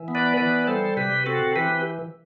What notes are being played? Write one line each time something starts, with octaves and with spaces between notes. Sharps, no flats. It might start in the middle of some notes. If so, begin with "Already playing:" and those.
Already playing: E3
B3
B4 D5
E3 B4 D5
G3 A4 C5
C3 G4 B4
C4 F#4 A4
E3 G4 B4